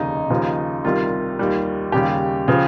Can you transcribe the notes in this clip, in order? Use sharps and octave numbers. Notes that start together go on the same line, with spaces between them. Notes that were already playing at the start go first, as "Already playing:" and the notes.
Already playing: F1 D#2 C#3 D#4
D#2 C#3 F3
C2 C3 D#3 G3 F4
D#2 D#3 G3
D#2 C#3 G3 G4
C#3 F3